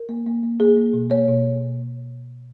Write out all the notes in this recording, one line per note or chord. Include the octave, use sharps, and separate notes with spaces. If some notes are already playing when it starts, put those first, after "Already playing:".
Already playing: A#4
A#3
A#3
A#3
A#3 G#4
A#3
B2
A#3 C#5
B2